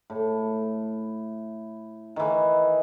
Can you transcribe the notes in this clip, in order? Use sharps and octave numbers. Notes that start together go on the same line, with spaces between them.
A2
D#3 E3